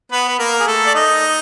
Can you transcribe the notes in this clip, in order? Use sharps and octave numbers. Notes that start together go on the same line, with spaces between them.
B3 B4
B4
A#3 A#4
G#4
A3 A4
D5
D#4 D#5